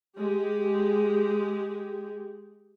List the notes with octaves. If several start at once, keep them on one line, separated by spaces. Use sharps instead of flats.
G#3 G4